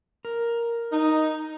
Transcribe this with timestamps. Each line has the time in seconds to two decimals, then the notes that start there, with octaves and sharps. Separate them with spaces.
0.25 A#4
0.92 D#4